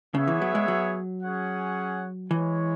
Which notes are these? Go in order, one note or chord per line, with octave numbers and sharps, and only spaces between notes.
C#3 B3 G#4 C#5 E5
E3
F#3
G#3
F#3
C#4 G#4 C#5 F#5
E3 G#3 E4 C#5